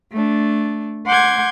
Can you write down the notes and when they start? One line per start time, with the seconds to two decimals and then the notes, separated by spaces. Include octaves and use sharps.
0.12 A3 D4
1.06 F#5 C6 D6 G6 G#6